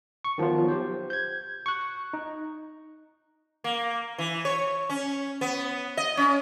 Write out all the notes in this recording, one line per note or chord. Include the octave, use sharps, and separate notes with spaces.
C#6
D#3 F3 F#3 B3 F4
G4 C5
G6 G#6
C#6 F#6
D#4
A#3
E3
C#5
C#4
B3
D#5
C#4